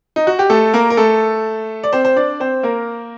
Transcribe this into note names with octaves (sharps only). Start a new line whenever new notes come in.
D#4
F#4
G4
A3 A4
A#3 A#4
A#4
A3 A4
D5
C4 C5
C5
D4 D5
C4 C5
A#3 A#4